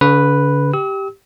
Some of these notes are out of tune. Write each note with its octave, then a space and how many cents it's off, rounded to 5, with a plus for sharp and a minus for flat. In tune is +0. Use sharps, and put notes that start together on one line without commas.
D3 -45 B4 +0
G4 -5 E6 -45